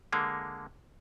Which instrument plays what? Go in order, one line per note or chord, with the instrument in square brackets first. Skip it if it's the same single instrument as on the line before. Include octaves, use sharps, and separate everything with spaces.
[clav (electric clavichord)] D3 G#3 A#3